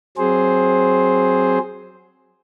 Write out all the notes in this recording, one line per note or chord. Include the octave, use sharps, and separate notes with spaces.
F#3 C4 G#4 C5